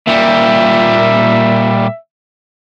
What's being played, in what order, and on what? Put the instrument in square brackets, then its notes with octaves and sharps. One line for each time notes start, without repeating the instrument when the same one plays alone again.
[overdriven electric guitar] A#2 G3 [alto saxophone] E5